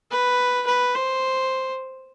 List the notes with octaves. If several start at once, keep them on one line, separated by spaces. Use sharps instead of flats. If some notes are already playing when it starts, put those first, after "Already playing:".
B4
B4
C5